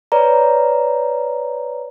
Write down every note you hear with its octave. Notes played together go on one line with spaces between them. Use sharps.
B4 C#5 D5 A#5